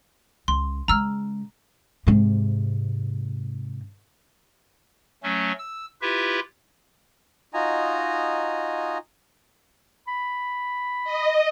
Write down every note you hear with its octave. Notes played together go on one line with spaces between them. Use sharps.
C#2 C6
C#3 G#3 A#5 E6 F6
G#2 C3
F#3 A3 C#4
E6
E4 F4 G4 B4 E5
D#4 F4 F#4 D#5 G#5 A#5
B5
D#5